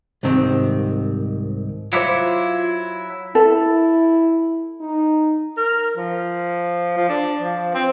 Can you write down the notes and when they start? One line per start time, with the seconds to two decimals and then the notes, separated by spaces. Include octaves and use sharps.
0.23 C2 G#2 D#3 C4
1.93 F#3 E4 F4 C5 D6 C#7
3.35 E4 A4
4.81 D#4
5.57 A#4
5.97 F3
6.97 F3
7.09 D4
7.41 F3
7.74 C4